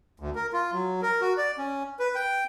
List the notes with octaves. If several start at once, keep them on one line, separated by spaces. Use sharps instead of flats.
D2
A#4
F4
F#3
A#4
F#4
D5
C#4
B4
G5